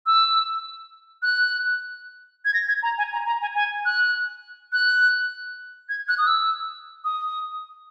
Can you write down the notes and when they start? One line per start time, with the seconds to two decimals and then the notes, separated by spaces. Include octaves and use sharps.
0.06 E6
1.23 F#6
2.45 G#6
2.54 A#6
2.68 G#6
2.83 A#5
2.98 G#5
3.13 A#5
3.26 A#5
3.41 G#5
3.55 G#5
3.85 F#6
4.73 F#6
5.89 G#6
6.08 F#6
6.18 D#6
6.27 E6
7.04 D#6